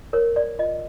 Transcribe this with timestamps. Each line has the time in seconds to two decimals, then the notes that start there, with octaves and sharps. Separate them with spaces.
0.13 A#4 C#5
0.36 D5
0.59 F4 D#5